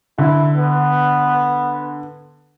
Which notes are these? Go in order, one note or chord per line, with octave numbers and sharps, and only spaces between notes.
D3 E4
B3